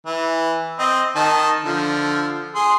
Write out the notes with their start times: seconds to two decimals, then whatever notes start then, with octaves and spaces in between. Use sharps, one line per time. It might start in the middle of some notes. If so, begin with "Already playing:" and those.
0.06 E3
0.79 C4 D#5
1.16 D#3 D#5 A5
1.65 D3 F3
2.55 G#4 C6